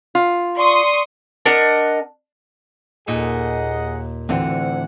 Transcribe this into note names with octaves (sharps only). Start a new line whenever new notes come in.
F4
D5 C6 C#6 D#6
D4 A#4 D#5 F#5
D#2 A#2 D#4 G#4 A4 D#5 F#5
D2 A2 D3 E3 C4 F#5